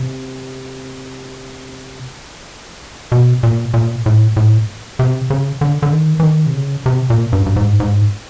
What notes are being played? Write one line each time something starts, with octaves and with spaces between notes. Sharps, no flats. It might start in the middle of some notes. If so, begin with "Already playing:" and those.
Already playing: C3
B2
A#2
A#2
A2
A2
C3
C#3
D3
D3
D#3
E3
D#3
C3
C#3
C3
A#2
G2
G2
G#2
G#2